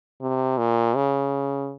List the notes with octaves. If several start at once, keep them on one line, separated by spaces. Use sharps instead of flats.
C3
A#2
C#3